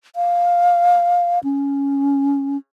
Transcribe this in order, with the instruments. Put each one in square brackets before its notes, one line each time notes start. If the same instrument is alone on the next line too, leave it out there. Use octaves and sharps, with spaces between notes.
[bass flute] F5
C#4